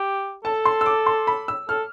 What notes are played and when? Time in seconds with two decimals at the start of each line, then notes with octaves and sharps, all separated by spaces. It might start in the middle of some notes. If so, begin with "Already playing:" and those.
Already playing: G4
0.45 A4 A5
0.65 C6
0.81 E6
0.86 D6
1.06 C6
1.27 B5
1.48 E6
1.69 A4 F6